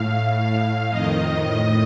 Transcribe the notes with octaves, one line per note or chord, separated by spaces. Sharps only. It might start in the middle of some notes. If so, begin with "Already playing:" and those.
Already playing: A2 F5
A2 F5
F2 D#3 D#5
A2 D#5